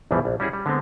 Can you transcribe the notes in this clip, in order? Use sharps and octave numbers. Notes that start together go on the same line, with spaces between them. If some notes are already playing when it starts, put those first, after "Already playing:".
A#1 E2 B2 E3 G3
A#1
G3 C#4 E4 F#4 G#4
G3
D3 G#3 B3 C4